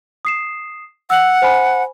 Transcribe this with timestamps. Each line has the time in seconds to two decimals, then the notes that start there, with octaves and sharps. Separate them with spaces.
0.25 D#6 C7 E7
1.10 F#5 E6 F#7
1.42 C5 G#5 B5